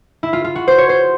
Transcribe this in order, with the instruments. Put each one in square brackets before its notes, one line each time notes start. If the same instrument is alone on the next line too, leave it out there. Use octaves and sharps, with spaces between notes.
[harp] E4
F4
F4
F#4
C5
C#5
C5